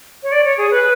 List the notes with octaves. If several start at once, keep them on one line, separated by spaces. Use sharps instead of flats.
C#5
D5
C#5
G#4
B4